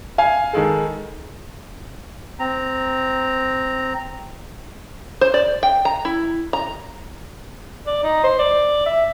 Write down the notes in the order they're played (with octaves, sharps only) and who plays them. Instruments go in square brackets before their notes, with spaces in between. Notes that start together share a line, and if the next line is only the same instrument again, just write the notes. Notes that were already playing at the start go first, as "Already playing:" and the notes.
[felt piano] F5 G#5
D#3 G#3 A4
[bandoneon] C4 A#5
[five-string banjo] C5
D5
G5
A#5
E4
A#5
[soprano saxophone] D5
D#4
C5
D5
E5